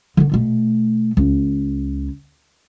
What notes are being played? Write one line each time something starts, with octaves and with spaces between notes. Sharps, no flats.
D3 D#3
B2 A3
C#2